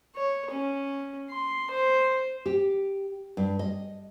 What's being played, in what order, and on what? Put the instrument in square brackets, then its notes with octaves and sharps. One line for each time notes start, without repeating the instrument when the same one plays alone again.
[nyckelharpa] C#5
C#4
C6
C5
[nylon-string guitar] G4
G2
D#5